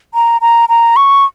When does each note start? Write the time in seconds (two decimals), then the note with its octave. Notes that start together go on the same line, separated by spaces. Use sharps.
0.14 A#5
0.41 A#5
0.69 A#5
0.96 C#6